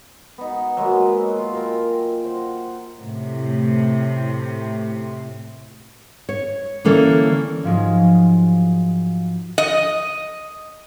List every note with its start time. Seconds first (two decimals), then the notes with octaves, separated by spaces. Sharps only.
0.38 B3 D#4
0.77 F#3 G#3 A#3 B3
1.38 F4
1.55 A#4 G5
2.24 C5 F#5
3.01 A2 C3
6.29 C#5
6.85 D3 E3 A#3 C#4 A4
7.64 G#2 F3 F#3 G#3
9.58 D#5